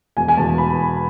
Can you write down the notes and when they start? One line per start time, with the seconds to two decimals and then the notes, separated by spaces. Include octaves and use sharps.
0.17 E1 G#5
0.28 G#5
0.37 E2 B2 A5
0.58 B5